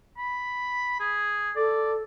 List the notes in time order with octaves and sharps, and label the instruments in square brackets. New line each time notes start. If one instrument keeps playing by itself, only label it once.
[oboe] B5
G#4
[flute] A4 [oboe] D5